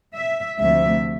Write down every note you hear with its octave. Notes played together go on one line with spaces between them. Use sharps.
E5
D2 C3 F3 A3 E5